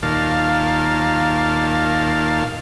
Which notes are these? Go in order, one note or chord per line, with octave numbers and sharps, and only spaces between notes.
D#2 A#2 F5 A5